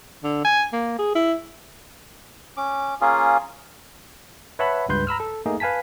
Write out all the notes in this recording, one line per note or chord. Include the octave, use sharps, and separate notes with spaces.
D3
G#5
A#3
G#4
E4
C#4 D6
A#3 C#4 F4 G#4
B4 C#5 E5 F#5 A5 B5
C#2 G2 B4 C6 G6
A#5 B5 E6 F6
A4
A3 A#3 D#4 G#4
B4 F5 G#5 A5 B6